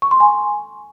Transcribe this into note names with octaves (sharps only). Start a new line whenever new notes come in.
C#6
C6
G#5